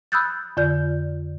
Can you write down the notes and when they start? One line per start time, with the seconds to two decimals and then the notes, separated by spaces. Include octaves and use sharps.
0.12 B5 D#6 E6 F#6 G6 A6
0.57 F2 D3 F4 D5 G6